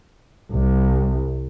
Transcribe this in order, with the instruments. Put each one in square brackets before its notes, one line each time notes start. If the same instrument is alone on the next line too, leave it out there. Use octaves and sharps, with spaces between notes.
[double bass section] C2